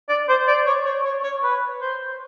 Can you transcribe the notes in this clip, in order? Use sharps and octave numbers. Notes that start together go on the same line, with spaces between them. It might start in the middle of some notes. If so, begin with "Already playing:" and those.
D5
C5
D5
C#5
C#5
C#5
C#5
B4
C5